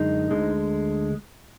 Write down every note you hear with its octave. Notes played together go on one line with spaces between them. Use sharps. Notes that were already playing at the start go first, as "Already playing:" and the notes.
Already playing: F#2 D3 G#3 D#4
D2 D3 G#3